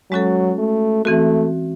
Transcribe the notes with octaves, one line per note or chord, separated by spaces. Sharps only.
F#3 G#3 C#4 F#4 A4
A3
E3 A3 C4 F#4